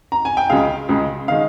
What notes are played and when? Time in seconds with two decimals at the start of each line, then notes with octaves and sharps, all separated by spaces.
0.12 A#5
0.25 G#5
0.37 G5
0.50 C#2 C#3 G#3 F5
0.89 C#2 C#3 G#3
1.28 D#3 G#3 F5